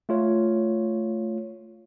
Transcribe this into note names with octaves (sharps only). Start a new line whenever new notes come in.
A3 F4 C#5